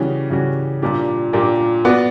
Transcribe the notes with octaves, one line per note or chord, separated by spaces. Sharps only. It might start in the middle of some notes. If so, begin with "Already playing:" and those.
Already playing: C#3 E3 G3 C#4 F#4
C#3 E3 G3 C#4 F#4
A#2 G3 A#3 D4 G4
A#2 G3 A#3 D4 G4
B3 F#4 B4 D5